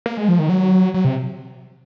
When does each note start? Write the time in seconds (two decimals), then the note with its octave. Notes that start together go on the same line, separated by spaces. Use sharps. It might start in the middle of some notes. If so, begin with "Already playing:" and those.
0.06 A#3
0.17 G#3
0.28 F3
0.39 D#3
0.49 F#3
0.94 F#3
1.05 C3